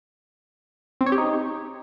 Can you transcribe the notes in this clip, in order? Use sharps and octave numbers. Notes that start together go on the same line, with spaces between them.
C4
C#5
G4
D#4